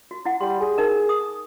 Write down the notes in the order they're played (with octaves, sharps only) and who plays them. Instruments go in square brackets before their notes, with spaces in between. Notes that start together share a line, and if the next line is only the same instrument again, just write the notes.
[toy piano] F#4
E4 F#5
[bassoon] G3 [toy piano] C6
[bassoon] G#4
[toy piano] D#4 A#4
D#6